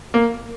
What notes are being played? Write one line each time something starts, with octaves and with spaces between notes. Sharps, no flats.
A#3